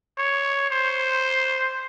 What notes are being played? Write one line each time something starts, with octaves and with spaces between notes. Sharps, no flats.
C#5
C5